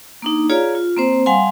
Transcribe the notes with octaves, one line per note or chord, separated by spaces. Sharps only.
A#3 D4 D#4
F4 G#4 C#5 D5 F5 A#5
F4
A#3 C4 C5
G3 F5 F#5 G#5 C6